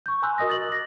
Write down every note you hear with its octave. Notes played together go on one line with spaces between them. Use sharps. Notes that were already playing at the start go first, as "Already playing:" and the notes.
C#6 G6
G#5 A#5 C6 E6 F#6
F#4 A#4 D#5 D#6 A#6
A6 F#7
D6 A#6